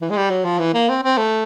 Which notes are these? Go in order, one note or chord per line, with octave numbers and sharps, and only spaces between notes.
E3
G#3
G3
F#3
F3
E3
A#3
C4
C4
A3